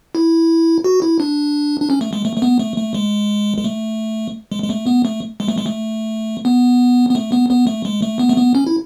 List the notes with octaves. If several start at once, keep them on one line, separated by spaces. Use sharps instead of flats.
E4
F#4
E4
D4
D4
C#4
A3
G#3
A3
A3
B3
A3
A3
G#3
G#3
A3
G#3
G#3
A3
B3
A3
G#3
A3
G#3
A3
B3
B3
A3
B3
B3
A3
G#3
A3
B3
A3
B3
C#4
E4